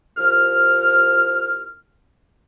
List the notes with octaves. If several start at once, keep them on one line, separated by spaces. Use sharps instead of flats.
C2 F3 F6